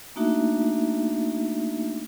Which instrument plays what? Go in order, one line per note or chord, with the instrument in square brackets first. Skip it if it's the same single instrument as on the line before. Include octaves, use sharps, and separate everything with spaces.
[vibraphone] A3 A#3 D4 D#4 F#4 E5